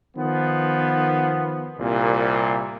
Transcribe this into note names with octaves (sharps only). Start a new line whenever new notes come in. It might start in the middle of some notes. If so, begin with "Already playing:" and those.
D#3 F3 B3
C2 A#2